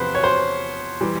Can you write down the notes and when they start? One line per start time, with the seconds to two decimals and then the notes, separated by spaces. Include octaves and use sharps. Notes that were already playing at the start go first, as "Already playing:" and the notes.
Already playing: E2 C3 F3 B4 C5
0.15 C#5
0.24 C5
1.01 E3 G3